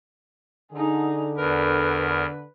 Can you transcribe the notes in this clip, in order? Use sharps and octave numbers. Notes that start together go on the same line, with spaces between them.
D3 D#4 G#4
E2 A#4 B4